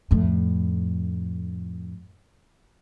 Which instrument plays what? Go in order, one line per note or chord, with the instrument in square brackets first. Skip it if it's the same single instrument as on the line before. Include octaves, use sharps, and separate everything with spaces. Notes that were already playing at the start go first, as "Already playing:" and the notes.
[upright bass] F2 A2